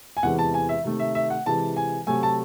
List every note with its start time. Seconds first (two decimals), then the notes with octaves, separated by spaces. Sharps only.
0.17 G#5
0.23 E2 C3 E3 G#3 F#5
0.39 A5
0.54 G#5
0.69 E5
0.84 C3 D#3 A3
1.00 E5
1.15 E5
1.30 F#5
1.46 C3 E3 G#3 A5
1.77 G#5
2.07 C3 F#3 A3 G#5
2.23 A5